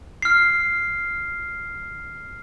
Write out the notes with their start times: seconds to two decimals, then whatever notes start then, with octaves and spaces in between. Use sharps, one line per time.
0.22 F6 C7